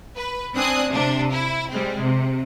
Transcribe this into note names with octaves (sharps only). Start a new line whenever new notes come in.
B4
C4 D4 G#5 D#6 F#6
C3 D4
E4
G3 G#3 C4
C3